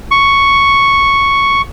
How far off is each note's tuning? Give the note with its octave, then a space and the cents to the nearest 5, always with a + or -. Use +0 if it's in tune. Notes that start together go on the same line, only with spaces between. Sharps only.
C#6 +0